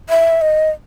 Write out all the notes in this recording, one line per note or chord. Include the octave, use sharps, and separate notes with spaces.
E5
D#5